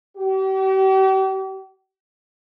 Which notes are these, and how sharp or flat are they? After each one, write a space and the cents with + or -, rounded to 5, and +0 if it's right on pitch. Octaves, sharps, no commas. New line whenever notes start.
G4 -40